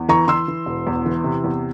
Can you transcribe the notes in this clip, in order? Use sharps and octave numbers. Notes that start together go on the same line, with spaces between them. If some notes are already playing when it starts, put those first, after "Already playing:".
Already playing: E2
E3 A#5 C#6
E3 C6 E6
E3
E1
E2
E3
C3
E2